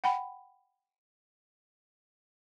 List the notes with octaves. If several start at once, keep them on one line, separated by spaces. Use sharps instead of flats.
F#5 G5 B5